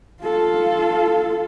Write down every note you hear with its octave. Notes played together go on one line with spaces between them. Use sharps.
F4 A4